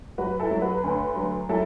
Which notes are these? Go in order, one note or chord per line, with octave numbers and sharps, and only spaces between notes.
F#3 F#4 B4
E4 A4
F#3
F#4 B4
D2
F#3
F#3 E4 A4